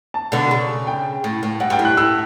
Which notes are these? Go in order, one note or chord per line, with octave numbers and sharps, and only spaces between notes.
A5
B2 D3
C#3
G5
A2
A2
G2 F#5
G2 G5
A2
F#6
A2 E6